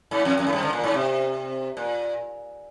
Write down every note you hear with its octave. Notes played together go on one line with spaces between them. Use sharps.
G#2
F2
F2
G#2
G2
D3
A#2
G#2
C3
A#2